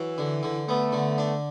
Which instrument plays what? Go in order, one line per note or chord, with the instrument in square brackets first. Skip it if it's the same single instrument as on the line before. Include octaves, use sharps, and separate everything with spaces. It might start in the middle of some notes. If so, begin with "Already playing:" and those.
Already playing: [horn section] E3 [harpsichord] F#3
[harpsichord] D3
D3
[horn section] A3 [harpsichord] B3
[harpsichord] D3
D4